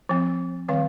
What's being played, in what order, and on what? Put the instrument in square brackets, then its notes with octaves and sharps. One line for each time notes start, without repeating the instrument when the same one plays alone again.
[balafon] F3 C4
D#3 G3 C4 F5